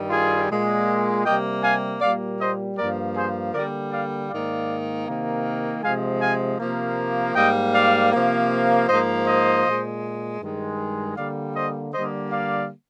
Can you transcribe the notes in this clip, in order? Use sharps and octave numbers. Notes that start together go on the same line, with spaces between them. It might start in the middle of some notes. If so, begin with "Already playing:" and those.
Already playing: G2 D#3 G3
F4 G#4
A#2 G#3
C3 G3 A#3 D#5 G5
F5 G#5
A#2 G3 A#3 D5 F5
C5 D#5
G2 F3 A#3 A#4 D5
G#4 C5
D3 G3 A#3 A#4 D5
D5 F5
G#2 D#3 A#3 D5 F5
C3 D#3 A#3
C3 F3 G#3 F5 G#5
F5 G#5
C3 F3 A#3
G#2 G3 A#3 D#5 G5
D5 F5
C3 F3 A#3
G#2 F3 A#3 C5 D#5
C5 D#5
A#2 G#3
G2 D#3 G#3
D3 G3 A#3 D5 F5
C5 D#5
D3 G3 A#3 C5 D#5
D5 F5